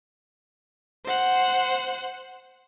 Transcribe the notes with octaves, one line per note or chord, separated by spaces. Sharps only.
C5 F#5